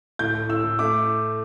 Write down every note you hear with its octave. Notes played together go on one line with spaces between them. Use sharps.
A2 G6
A2
A2 E6
A2
A3 D6